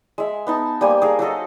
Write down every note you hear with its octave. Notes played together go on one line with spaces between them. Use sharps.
G#3 E5
B3 D#4 A5
G3 A#3 C5 G#5
G#4 A#4 F5
F#3 F#4 A4 D#5